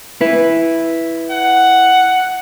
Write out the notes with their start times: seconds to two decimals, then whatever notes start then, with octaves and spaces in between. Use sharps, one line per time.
0.21 E4 B4
1.30 F#5